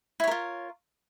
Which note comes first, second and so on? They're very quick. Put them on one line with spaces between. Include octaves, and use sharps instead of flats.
E4 C#5 A#4 F4